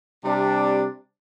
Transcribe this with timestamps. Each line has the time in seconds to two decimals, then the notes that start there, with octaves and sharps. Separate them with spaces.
0.24 C3 G3 D4